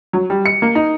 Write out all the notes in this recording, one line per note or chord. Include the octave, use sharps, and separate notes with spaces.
F#3
G3
C#7
A#3
D#4